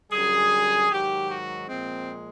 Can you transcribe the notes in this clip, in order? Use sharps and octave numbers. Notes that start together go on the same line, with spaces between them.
F#2 D3 G3 G#4
G#2 D#3 F#3 G4
F#4
A#2 F3 G#3 C4